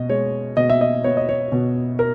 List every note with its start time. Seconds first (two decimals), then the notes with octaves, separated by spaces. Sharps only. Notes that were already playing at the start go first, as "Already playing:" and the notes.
Already playing: B2 D#5
0.10 G#3 C#5
0.57 B2 D#5
0.70 E5
0.81 D#5
1.04 B3 C#5
1.17 D#5
1.29 C#5
1.52 B2
1.99 A#4